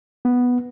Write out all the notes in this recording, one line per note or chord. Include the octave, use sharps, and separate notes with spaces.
B3